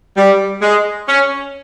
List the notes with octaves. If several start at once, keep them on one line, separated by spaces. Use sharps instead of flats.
G3
G#3
C#4